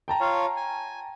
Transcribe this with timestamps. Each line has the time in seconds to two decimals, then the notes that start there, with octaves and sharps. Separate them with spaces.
0.08 G5 A5 A#5
0.21 F4 C#5 F5
0.57 G#5